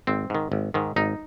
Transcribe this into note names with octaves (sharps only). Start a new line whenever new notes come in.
G#1 C4
G#2 D#3
G#1
G#2 D#3
G#1 D#4